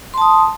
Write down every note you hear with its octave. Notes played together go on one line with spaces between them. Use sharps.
A5 C6 D#6